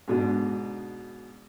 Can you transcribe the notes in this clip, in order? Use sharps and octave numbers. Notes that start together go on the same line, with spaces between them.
G#2 B2 D4